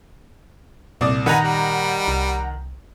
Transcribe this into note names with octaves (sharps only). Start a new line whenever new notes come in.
C2 A#2 D5 D#6
D#3 B4 F#5 G#5 A#5
G3
C2